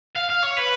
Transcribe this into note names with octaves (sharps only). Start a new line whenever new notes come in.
F5
F5
C#5
B4